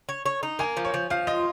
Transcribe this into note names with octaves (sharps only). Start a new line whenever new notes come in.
C#5
C#5
D#4
A#3 G#5
F3
C#5
F3
F3 F5
F4 D#5